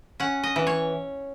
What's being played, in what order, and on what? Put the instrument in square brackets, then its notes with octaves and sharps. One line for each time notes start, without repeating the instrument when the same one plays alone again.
[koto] C#4 F#5
D#5
E3
C#5